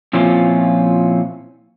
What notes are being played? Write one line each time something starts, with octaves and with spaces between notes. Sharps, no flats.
A#2 F3 C4 C#4 E4 F4